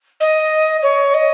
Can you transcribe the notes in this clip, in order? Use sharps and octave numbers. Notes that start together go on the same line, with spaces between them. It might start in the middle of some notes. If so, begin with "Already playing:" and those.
D#5
C#5
D#5